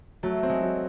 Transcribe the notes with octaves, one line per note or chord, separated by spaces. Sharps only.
F#3 A3
C4
G#3
F#3